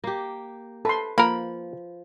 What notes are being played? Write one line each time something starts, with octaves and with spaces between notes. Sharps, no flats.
A#3 G4
A4 B4 C6
F3 A#3 A#4 B5